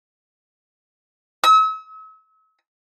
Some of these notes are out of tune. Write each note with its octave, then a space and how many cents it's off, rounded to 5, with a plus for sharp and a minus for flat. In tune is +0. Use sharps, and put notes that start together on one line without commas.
E6 -40